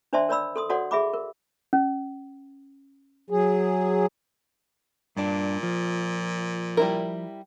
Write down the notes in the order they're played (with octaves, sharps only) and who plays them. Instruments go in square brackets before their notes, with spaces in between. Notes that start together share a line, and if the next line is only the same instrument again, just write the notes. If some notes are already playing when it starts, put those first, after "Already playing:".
[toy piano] D4 C5 D5 E5 A5 C6
A#4 C#5 D5 B5 E6
A4 C6 D#6
F#4 A4 C#5 D5 F#5 C6
G#4 E5 B5 D6
A#4
C#4
[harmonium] F#3 G#4
[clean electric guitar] G2 D4 [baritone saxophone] A#2
[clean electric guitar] F3
[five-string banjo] G3 E4 A#4